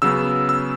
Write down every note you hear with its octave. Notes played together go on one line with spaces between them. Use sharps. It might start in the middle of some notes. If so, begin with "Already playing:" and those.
C#3 F#3 B3 E6
E6